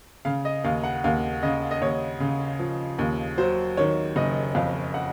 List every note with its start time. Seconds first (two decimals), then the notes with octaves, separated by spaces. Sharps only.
0.25 C#3 F5
0.45 D#5
0.64 D#2 F5
0.84 F#5
1.04 D#2 F5
1.43 C#3 D#5
1.71 D#5
1.81 D#2 C#5
2.20 C#3
2.59 F3
2.99 D#2
3.38 F#3 C5
3.77 D#3 C#5
4.16 F#1 D#5
4.55 F2 F5
4.94 F#5